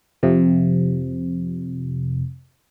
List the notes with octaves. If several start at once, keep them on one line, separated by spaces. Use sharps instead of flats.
F2 C3 F3